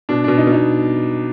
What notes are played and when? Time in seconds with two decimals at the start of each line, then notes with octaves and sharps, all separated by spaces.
0.09 B2 D4
0.24 B2 D4
0.38 D#4
0.47 B2
0.52 D#4